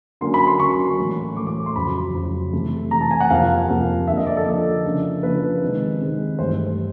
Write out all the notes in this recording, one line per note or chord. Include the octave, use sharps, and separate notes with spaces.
D3 F#3 A#3 C#4 C6
B5
C6
D3 F#3 A#3 C#4 C#6
A2 E3 A3
A2 E3 A3 D6
D6
C6
F2 C#3 F#3 B5
F2 C#3 F#3
C3 E3 A3
C3 E3 A3 A#5
A5
G#5
F#5
F2 C3 F3 A#3 F5
F2 C3 F3 A#3
D3 F3 A#3 E5
D#5
D5
A4
D3 F3 A#3
C#3 F3 A#3 D4
C#3 F3 A#3 D4 B4
C3 D#3 G#3 C4
C3 D#3 G#3 C4
G2 E3 A3 C5